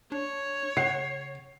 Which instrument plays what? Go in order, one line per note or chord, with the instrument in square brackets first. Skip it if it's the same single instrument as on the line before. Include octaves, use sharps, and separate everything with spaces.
[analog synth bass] D4 [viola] C#5
[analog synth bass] C#3 [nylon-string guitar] F#5 [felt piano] C7